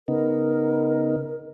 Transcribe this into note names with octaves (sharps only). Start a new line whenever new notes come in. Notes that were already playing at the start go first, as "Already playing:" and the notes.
C#3 B3 D#4 A#4